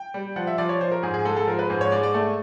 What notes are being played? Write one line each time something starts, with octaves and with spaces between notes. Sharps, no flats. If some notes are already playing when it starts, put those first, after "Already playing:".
Already playing: G5
G3
F3 F#5
E5
F3 D5
C#5
F3 C5
A#4
G#2 G#4
G#4
G#3 A4
A4
F3 A#4
B4
G#2 C5
C#5
G#3 D5
D5
A3